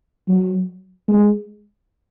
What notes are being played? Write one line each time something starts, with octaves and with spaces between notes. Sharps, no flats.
F#3
G#3